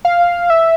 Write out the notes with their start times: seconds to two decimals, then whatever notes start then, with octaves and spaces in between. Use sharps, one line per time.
0.05 F5
0.50 E5